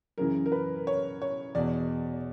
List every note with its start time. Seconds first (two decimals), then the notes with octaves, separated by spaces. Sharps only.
0.18 F#2 C#3 E3 A#4
0.46 A#4
0.52 B4
0.87 C#5
1.22 C#5
1.55 E2 B2 D5